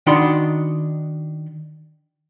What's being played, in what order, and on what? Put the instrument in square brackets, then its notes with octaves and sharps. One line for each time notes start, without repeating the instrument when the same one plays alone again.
[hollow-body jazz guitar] D#3 D4 D#4 F#4 B5 C6